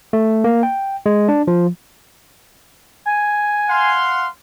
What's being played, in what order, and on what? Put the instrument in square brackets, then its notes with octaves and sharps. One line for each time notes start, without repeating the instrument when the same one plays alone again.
[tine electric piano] A3
A#3
G5
G#3
D4
F3
[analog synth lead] G#5
[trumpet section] F5 F#5 C6